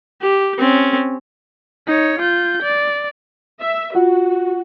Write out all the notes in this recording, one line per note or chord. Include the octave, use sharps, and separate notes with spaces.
G4
C4 C#4
D#4 C#5
F4 G6
D5
E5
F4 F#4 F#5